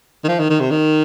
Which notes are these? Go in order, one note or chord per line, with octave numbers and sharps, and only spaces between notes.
D#3
F3
D#3
D#3
C3
D#3